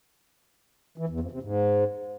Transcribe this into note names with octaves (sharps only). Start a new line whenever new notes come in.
E3
E2
F2
C3
G#2